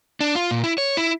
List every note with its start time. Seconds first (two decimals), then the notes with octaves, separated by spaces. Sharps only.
0.21 D4
0.35 F4
0.51 A#2
0.64 E4
0.78 C#5
0.97 E4